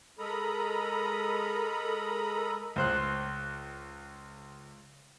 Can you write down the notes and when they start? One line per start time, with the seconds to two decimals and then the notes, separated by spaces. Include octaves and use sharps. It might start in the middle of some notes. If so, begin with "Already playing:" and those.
0.19 G#3 A4 A#4 A#5 B5 D#6
2.76 C#2 C5 F#6